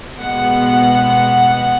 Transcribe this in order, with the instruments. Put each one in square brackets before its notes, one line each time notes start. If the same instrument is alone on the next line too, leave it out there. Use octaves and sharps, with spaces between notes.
[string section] B2 G#3 B3 F#5